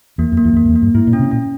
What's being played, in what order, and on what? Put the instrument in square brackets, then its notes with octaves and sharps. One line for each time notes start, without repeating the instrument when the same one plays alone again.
[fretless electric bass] E2 [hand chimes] A#3
[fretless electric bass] F2
[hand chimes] A#3
[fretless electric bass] E2
F2
[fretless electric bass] E2 [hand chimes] A#3
[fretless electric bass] F2
E2
[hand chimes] A#3
[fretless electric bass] G2
[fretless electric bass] G#2 [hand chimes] E4
[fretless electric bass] A#2
[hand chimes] C#4
[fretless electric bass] C3
[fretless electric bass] A#2 [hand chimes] C#4